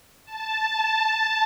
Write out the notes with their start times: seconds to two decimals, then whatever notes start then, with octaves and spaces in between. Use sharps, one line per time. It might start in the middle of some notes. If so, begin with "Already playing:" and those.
0.25 A5